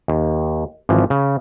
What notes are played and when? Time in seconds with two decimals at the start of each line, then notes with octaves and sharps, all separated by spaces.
0.08 D#2
0.89 G#1 E3 F3
1.10 C#3